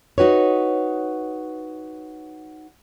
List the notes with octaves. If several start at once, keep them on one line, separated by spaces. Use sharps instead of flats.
D#4 F#4 B4 C#5